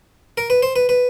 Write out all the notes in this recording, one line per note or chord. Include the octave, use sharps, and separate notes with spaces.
A#4
B4
C5
B4
B4